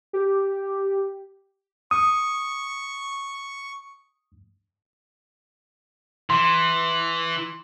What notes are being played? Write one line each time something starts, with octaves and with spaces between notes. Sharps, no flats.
G4
C#6 D#6
E3 C6